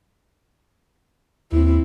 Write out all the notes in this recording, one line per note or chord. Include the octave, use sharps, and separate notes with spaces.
D#2 C4 E4